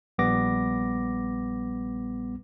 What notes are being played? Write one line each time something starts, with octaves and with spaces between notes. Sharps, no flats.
A#1 G3 B3 D6 A#6